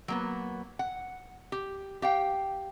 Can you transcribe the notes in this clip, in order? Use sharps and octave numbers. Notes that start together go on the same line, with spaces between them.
F#3 A#3 B3
F#5
G4
G4 F5 G5